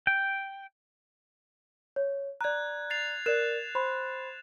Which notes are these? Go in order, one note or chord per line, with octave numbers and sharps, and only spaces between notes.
G5
C#5
D5 A#5 F#6 G#6
A6 C7 F7
A#4 D5 F#6 E7
C5 B5 C6